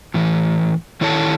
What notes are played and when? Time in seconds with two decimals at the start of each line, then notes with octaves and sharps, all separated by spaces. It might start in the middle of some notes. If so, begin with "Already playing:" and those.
0.14 A2 E3
1.01 D#3 E4 A4 C#5 E5 A5